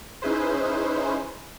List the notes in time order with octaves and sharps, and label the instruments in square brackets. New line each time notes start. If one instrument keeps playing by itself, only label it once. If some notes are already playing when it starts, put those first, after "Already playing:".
[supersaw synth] C#4 D#4 E4 G#4 B4 C5